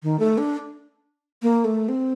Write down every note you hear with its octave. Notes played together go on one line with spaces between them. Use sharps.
D#3
A3
D4
A#3
A3
C4